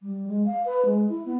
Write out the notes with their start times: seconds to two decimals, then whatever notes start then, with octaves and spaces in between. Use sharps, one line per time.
0.02 G3
0.28 G#3
0.46 F5
0.65 B4
0.86 G#3
1.09 E4
1.25 B3